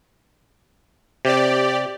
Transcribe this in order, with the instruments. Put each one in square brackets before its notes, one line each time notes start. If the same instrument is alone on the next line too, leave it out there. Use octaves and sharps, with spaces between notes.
[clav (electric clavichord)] C3 [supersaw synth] G4 D5